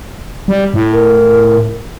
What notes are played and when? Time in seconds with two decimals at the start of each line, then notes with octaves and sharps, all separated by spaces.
0.48 G3
0.74 A2
0.93 A#4